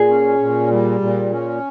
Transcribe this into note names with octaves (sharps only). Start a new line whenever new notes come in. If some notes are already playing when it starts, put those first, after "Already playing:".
Already playing: A#2 G#4
C#4
A#2
G3
A#2
C#4